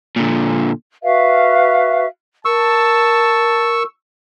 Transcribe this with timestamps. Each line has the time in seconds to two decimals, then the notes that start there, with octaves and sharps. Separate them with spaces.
0.16 A#2 D3
1.02 F#4 B4 E5 F5
2.45 A#4 A5 C#6 E6